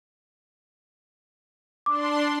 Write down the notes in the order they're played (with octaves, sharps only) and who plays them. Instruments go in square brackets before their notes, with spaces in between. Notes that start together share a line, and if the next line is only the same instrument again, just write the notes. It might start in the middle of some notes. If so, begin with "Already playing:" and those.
[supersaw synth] D4 C6 [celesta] D6